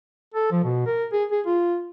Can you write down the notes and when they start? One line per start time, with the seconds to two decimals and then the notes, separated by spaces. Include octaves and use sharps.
0.34 A4
0.51 F3
0.64 B2
0.86 A#4
1.12 G#4
1.31 G#4
1.46 F4